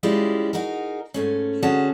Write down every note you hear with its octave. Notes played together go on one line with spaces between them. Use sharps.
G3 G#3 C#4 E4 F4 G4
D#4 F#4 G#4 A#4
G#2 A3 C#4
D3 C#4 F#4 G#4 A5